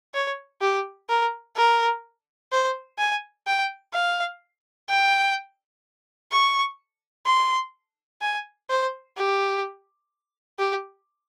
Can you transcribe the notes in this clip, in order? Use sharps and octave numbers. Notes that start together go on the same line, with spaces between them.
C#5
G4
A#4
A#4
C5
G#5
G5
F5
G5
C#6
C6
G#5
C5
G4
G4